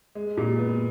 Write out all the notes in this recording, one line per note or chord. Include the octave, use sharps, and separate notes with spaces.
G#3
A#2
B3